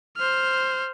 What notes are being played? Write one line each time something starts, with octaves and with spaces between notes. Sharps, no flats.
C5 F6